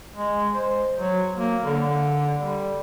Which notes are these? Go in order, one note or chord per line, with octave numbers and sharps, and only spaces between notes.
G#3
C5
F#3
A#3
D3
G3